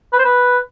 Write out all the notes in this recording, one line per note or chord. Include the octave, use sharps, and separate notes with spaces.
B4
C5
B4